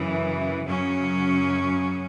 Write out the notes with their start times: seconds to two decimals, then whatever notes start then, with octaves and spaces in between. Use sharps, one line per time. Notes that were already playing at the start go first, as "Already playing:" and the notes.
Already playing: F#2 C#3 E3
0.65 F#2 C#3 F#3 C#4